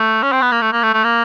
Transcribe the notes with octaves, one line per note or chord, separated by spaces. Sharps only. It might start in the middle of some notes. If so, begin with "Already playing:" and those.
Already playing: A3
C#4
C4
B3
A#3
A3
A#3
A3
A3
A#3